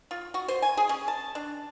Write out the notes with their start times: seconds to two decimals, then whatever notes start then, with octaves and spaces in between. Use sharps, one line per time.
0.11 F4
0.34 F#4
0.48 C5
0.62 G#5
0.77 G#4
0.89 C#4
1.08 A5
1.35 D4